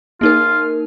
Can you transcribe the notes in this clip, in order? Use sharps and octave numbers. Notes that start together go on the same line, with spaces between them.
A#3 D#4 F4 A#4